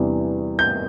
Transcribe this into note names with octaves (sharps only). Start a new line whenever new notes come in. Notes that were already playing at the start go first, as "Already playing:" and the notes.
Already playing: E2 C3 E3 G3 D4
G6